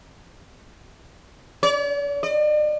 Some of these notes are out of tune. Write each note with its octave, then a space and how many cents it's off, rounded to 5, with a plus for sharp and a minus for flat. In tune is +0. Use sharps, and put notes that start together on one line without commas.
D5 -45
D5 +45